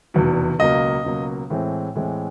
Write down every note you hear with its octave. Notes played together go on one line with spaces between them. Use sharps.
F1 E2 B2
C#2 B2 F#3 A#3 D#5
C#2 B2 F#3 A#3
A2 E3 G#3 C4
A2 E3 G#3 C4